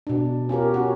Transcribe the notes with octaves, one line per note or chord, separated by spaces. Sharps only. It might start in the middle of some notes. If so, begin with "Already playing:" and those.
B2 D4
C#4 F4 G4 A#4
C#4 F#4